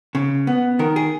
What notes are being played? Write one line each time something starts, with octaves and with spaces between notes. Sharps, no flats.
C#3
B3
D#3 A#4
G#4